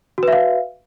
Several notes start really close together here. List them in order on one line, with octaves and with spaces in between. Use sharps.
F#4 B4 E5 F5